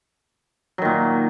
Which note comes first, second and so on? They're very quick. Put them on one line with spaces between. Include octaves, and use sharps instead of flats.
F#3 D#3 A#2